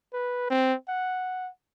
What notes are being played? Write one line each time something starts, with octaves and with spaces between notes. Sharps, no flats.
B4
C4
F#5